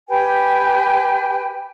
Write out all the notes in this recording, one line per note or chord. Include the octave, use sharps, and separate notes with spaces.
G4 B4 G5 G#5